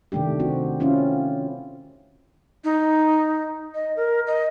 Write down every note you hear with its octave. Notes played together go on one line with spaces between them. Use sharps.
C3 D#3 A3 D4 G4
C4 F#4
C4 C#4 E4 F4
D#4
D#5
A#4
D#5